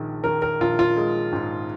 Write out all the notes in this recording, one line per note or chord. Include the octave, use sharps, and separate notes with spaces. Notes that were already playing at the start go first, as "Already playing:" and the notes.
Already playing: A#1 D#3 G#3
D#3 A#4
A#4
A#1 F4
F4
G#3
G#2